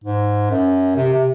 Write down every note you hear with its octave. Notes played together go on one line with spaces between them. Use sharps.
G#2
F#2
C3
C3